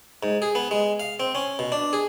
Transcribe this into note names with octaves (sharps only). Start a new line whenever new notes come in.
G#2
G#4
B3
G#3
F5
C4
C#4
B2
D4
G#4